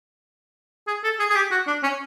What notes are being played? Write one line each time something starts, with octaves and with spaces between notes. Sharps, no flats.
G#4
A4
G#4
G#4
G4
F#4
D4
C#4